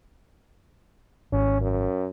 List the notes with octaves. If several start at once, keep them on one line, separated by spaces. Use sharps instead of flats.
G#1 C#4
F#2